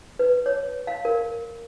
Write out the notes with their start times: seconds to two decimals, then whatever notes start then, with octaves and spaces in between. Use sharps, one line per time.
0.19 B4
0.46 C#5
0.87 F5
1.05 A#4